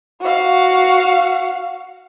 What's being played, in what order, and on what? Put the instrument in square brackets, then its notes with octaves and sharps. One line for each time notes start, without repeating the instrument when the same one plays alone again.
[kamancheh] F#4 F5